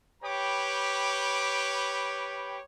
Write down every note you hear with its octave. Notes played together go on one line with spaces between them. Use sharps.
G4 B4 C#5 G5 B5 D6